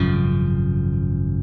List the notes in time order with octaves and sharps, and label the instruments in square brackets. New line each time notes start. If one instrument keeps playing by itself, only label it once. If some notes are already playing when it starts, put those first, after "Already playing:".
Already playing: [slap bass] G#1 F#2 C#3 F3